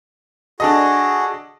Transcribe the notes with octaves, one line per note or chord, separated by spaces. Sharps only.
D4 F#4 G#4 A4 D#5